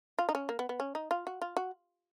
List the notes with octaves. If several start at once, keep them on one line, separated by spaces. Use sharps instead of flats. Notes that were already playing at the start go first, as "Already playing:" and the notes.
F4
D#4
C#4
A#3
B3
B3
C#4
D#4
F4
F#4
F4
F#4